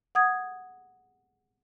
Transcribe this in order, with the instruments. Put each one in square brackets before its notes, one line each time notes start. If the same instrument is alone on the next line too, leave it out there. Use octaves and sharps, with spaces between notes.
[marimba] F#5 D#6 G#6